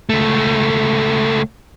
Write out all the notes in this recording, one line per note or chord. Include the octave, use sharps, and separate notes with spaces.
C#2 A3